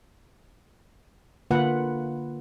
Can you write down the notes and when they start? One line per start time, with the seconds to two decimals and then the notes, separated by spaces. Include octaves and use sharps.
1.51 D3 A#3 F4 B4 F#5